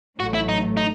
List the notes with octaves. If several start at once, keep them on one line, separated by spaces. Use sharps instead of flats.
A1 A2 F#3 A3 F#4
E4
D#4
D#4